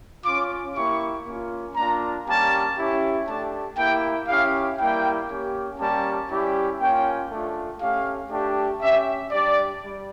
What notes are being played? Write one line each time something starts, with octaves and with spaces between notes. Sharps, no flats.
C#4 F4 D6
A#3 E4 G4 C#6
A#3 C#4 F4
A#3 D4 F4 A#5
G3 A#3 C#4 G4 A5
C#4 E4 G4
A3 D4 G4 A5
A#3 E4 G4 G5
C#4 E4 G4 F5
G3 A#3 E4 G5
A#3 C#4 G4
G3 A#3 C#4 G4 A5
G3 C#4 E4 G4
A#3 C#4 F4 G5
A3 D4 F4
A3 C#4 G4 F5
A3 D4 G4
C#4 G4 E5
G3 D4 G4 D5
G3